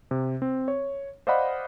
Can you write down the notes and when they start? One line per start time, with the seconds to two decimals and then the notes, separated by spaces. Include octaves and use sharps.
0.11 C3
0.42 C4
0.68 C#5
1.27 C5 D5 D#5 F5 F#5 B5